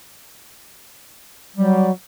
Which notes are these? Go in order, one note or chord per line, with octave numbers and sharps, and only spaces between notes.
F#3 G3